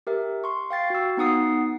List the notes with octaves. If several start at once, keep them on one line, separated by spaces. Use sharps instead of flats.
G4 A#4 E5
C6 C#6
F5 G5 A6 C7
F#4 E6
B3 D#4 F#5 D#6 C7